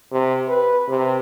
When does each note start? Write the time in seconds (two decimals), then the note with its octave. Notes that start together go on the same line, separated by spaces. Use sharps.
0.12 C3
0.49 B4
0.88 C3